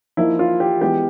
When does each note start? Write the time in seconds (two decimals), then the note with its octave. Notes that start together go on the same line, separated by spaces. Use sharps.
0.17 F3 A#3 D#4 E4
0.39 F4
0.60 G4
0.81 E3 G#3 B3 G4